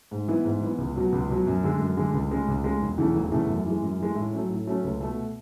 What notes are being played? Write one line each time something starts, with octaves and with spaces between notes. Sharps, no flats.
G#2
E3 B3 E4
G#2
E3 B3 E4
C#2
B2 F#3
C#2
B2 F#3
F#2
D3 G#3
F#2
D3 G#3
C#2
C#3 G#3
C#2
C#3 G#3
E1
E2 C#3 E3 A3
E1
E2 C#3 E3 A3
F#2
E3 G#3
F#2
E3 G#3
A2
F#3 A3 C#4
A2
F#3 A3 C#4
C#2
B2 A3